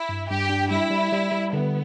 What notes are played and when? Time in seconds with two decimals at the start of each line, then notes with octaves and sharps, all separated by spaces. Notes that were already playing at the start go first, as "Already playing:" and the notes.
Already playing: E4
0.09 G2
0.30 G2 G4
0.49 D4
0.71 G3 E4
0.91 G3
1.12 G3
1.32 G3
1.53 D3 B3